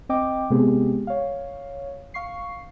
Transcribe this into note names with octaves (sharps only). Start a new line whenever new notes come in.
C4 D#5 G5 D6
C3 G#3 B3 C4 G4 G#4
C#5 F5
F5 C#6 C7